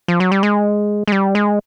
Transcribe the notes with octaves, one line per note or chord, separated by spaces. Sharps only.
F3
F#3
G3
G#3
G#3
G3
G#3